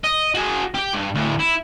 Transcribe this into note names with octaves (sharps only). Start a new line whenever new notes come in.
D#5
F#4 G#4
G4 G5
G2
D2 A2
E4